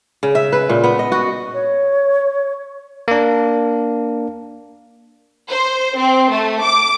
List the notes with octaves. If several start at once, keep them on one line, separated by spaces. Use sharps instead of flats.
C#3
E5
B4
A#2
B3
D#5
F#4
C#5
A#3 D4
C5
C4
A3
D6